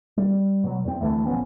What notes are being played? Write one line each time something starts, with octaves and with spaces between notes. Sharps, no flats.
G3
B2 F#3
E2 C4
D2 E3 A3
A#1 F3 B3 C#4